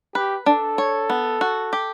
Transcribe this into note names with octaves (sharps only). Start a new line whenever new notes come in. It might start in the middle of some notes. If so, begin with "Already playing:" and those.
G4 B4
D4 A4
C#5
B3
F#4
G4